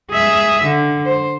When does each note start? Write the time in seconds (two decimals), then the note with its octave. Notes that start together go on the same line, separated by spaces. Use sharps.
0.11 G#4 E5
0.64 D3
1.06 C5